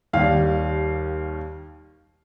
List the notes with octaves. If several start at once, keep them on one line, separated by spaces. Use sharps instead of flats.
D#2 D#3 G3 F5